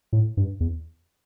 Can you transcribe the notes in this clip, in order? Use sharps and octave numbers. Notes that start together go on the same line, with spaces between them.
A2
G2
E2